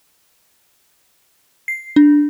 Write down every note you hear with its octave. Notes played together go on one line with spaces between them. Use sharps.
C7
D4